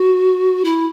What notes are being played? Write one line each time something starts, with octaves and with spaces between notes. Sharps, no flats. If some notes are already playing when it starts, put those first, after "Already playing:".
Already playing: F#4
E4